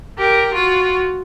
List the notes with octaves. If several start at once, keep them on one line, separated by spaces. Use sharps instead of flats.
G4 A#4
F4 F#4